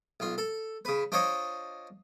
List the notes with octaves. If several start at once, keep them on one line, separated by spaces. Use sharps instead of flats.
B1 F4
A4
C#3 B4
D4 F4 C5 C#5 D#5 C#6